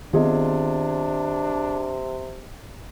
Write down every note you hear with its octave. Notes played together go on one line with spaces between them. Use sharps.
C3 D#3 B3 C4 D4 F4 G#4 D#5